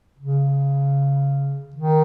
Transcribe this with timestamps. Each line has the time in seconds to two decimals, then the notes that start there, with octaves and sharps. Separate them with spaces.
0.19 C#3
1.75 D#3